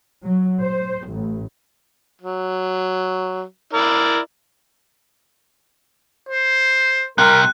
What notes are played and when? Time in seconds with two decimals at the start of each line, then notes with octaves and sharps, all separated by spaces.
0.23 F#3
0.60 C5
1.08 A1
2.21 F#3
3.73 E4 A#4 D5
6.29 C5
7.18 C3 G3 A#4 F#6